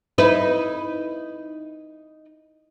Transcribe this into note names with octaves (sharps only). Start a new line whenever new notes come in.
D#4 E4 B4